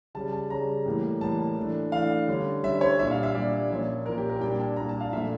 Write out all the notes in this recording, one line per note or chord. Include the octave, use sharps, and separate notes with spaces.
C#3 G3 C#4 A5
A5
C#3 G3 C#4 A#5
A2 E3 G3 A#3
A2 E3 G3 A#3 A5
E3 A3 D4
E3 A3 D4 F5
D3 G3 C#4
D3 G3 C#4 E5
C#5
A#2 G3 D4 E5
F5
E5
A#2 G3 D4 D5
A#2 F3 A#3 C#4
A#2 F3 A#3 C#4 A#4
G4
A#4
A#2 G3 A#3 D4 G5
A5
A#2 G3 A#3 D4 A#5
A5
F5
A#2 F3 A3 D4 E5